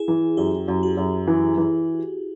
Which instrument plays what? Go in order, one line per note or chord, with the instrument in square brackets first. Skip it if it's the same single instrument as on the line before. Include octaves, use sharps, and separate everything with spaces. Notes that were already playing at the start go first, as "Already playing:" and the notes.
Already playing: [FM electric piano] E4 G#4
[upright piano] E3
[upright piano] F#2 [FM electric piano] G4
[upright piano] F#2
[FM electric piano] F#4
[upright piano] F#2
E3
E3